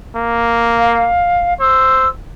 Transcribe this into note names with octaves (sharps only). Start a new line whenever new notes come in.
A#3
F5
C5 E6